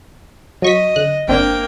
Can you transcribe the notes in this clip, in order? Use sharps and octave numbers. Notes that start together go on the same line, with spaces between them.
F#3 D#5 C#6 B6
D3 F#6
G1 A#3 C4 D4 G5